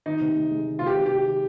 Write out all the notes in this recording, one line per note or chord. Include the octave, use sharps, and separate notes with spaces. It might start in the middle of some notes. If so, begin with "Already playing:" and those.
D#3 D#4
C3
C3
G#3
D#3
F4
C3 G4
C3
G4
G#3
D#3